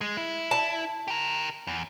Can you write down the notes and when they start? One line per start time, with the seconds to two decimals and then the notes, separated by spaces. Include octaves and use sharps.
0.01 G#3
0.17 E4
0.51 A5
1.08 G4 A#4
1.67 E2